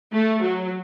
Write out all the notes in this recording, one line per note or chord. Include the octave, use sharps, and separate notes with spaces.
A3
F#3